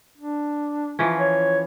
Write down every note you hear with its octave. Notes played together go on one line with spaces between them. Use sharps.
D4
E3 F3 C#4
C#5